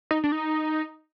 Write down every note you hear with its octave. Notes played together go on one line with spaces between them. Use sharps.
D#4
D4
D#4